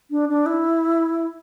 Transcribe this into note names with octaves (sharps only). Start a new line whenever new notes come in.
D4
D4
E4